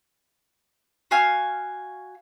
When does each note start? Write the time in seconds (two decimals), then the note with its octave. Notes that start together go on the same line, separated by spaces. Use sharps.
1.11 F#4 F5 G#5 F6